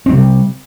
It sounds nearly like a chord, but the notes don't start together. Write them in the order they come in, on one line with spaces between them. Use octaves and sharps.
C4 G3 C3